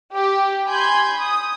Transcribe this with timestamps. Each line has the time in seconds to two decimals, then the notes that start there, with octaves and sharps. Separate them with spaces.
0.13 G4
0.69 G#5 B5 C6 G6 G#6
1.19 D#6